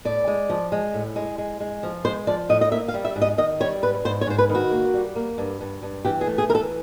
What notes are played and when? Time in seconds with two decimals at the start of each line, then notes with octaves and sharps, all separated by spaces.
0.05 A2 D5
0.27 G#3
0.49 F3
0.72 G#3
0.94 A2
1.16 G#3
1.38 G#3
1.60 G#3
1.83 F3
2.05 G#3 C5
2.27 F3 D5
2.49 A2 D#5
2.61 D#5
2.72 A#3 E5
2.88 F5
2.94 G3
3.05 E5
3.16 G#2
3.21 D#5
3.38 D#3 D#5
3.60 G3 C#5
3.82 G#2 B4
4.05 G#2 C5
4.21 C#5
4.27 G#2 C5
4.38 B4
4.49 D#3
4.55 F#4
4.71 A#3
4.94 G3
5.16 A#3
5.38 G2
5.60 G2
5.83 G2
6.05 E3 G4
6.21 G#4
6.27 A3
6.38 G#4
6.49 E3 A#4
6.55 A4